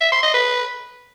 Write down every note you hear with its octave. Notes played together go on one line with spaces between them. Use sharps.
E5
C6
D#5
B4